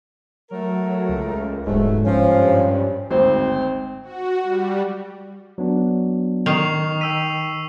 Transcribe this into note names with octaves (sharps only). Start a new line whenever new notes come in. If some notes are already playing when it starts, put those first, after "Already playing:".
F#3 A3 A#4
C#2
D#1 G#2 B2 F#3 A3
G2 F3 C#4
G#1 D2 C4 C5
F#4
G3
F#3 B3 D4
D#3 C#6 C7 F7
G5 E6 B6 D#7